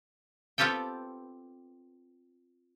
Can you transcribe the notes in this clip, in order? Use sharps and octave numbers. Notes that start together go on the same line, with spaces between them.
B3 C4 F4 G4 A4 G5